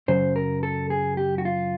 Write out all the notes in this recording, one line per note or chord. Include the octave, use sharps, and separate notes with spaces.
F#2 C#3 F#3 C5
A#4
A4
G#4
G4
F#4
F4